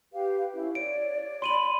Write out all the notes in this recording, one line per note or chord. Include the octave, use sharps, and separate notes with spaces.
G4 B4 F5
C#4 E4
C#5 D5 D7
B5 C6 D#7 F#7